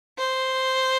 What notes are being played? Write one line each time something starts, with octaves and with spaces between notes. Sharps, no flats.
C5